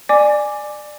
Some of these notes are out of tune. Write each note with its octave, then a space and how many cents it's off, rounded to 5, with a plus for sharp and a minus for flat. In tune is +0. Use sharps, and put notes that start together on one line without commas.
D5 +20 G#5 +0 D6 +0